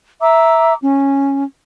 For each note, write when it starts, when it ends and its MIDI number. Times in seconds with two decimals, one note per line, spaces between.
0.22 0.74 76
0.22 0.74 82
0.22 0.74 86
0.22 0.74 88
0.82 1.44 61